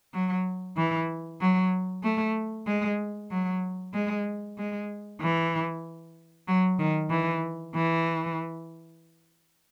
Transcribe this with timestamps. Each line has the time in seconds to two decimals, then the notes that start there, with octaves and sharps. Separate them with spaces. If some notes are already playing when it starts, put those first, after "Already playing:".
0.13 F#3
0.76 E3
1.41 F#3
2.04 A3
2.67 G#3
3.31 F#3
3.94 G#3
4.58 G#3
5.21 E3
6.48 F#3
6.79 D#3
7.10 E3
7.75 E3